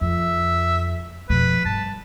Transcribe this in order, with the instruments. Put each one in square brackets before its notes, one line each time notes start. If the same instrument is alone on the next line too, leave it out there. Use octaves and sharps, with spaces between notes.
[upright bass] F2 [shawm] E5
[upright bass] F2 B2 [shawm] B4
[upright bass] G2 [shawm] A5